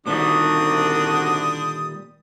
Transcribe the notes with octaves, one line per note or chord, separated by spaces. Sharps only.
C2 A#2 D3 D#3 G3 D4 F#4 D#6